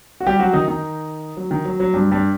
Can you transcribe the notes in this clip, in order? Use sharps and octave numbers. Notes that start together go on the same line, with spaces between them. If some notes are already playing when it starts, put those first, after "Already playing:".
F#4
G3 G4
F#3 F#4
D#3 D#4
D#3 D#4
F#3
D#3
F#3
F#3
G2 G3
G2 G3